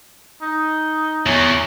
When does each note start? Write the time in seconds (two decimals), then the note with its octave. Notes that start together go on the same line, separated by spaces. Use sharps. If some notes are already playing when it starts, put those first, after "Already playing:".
0.42 D#4
1.26 E2 C#5